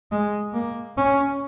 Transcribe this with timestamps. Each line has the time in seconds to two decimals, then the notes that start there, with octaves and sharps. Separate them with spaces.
0.12 G#3
0.54 A#3
0.97 C#4